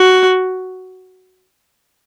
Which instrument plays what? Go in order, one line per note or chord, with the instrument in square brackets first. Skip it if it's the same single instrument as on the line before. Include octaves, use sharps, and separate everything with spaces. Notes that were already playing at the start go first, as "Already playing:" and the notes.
Already playing: [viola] F#4